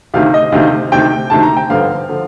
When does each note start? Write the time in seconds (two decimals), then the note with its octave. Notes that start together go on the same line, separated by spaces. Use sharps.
0.14 D2 C3 D#3 F5
0.34 D#5
0.52 D2 C3 D#3 F5
0.92 D2 C3 D#3 G5
1.30 D2 C3 D#3 A5
1.43 A#5
1.57 G5
1.69 G1 G2 D3 F3 F5
2.09 D3 F3